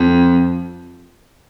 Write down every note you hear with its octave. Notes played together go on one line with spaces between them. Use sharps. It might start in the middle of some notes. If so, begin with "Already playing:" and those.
Already playing: F2